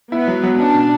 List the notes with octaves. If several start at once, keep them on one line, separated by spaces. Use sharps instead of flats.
B3 E4
F#3
F#3
C#4 D4
B2